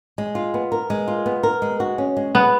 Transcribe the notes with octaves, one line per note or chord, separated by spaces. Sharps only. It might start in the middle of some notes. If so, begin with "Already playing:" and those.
G#3
F4
B3
A#4
G#3
F4
B3
A#4
G#3
F#4
C#4
G#3
G#3 B3